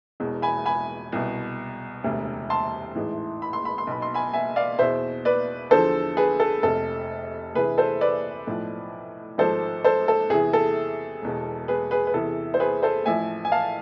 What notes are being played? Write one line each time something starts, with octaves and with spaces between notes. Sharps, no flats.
E1 E2 B2
G#5 B5
G#5 B5
C2 B2
E1 D2 C3
A5 C6
A1 G#2 E3
B5
C6
B5
C6
B1 B2 B5
C6
G#5 B5
E5 G#5
D5 F5
E2 B2 C5 E5
B4 D5
E2 D3 F3 A4 C5
G#4 B4
A4
F1 F2 C3 A4
D2 C3 E3 G#4 B4
A4 C5
B4 D5
B1 A2 F3
G#1 G#2 F3 A4 C5
A4 C5
A4
E2 C3 E3 G#4
A4
E1 E2 B2
G#4 B4
G#4 B4
B4
E2 C3 E3 A4
C5
G#4 B4
A4 C5
A1 A2 F3 E5 G#5
G#5
F5 A5